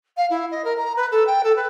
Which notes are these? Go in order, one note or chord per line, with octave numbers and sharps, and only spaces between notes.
F5
E4
D#5
A#4
A#5
B4
A4
G5
A4
B4